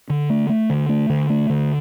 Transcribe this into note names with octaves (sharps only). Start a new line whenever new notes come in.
D3
A3
A3
D3
A3
D3
A3
D3